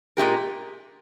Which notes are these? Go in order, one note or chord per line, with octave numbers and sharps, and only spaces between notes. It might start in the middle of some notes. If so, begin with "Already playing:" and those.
A#2 G#3 D#4 G4 A#4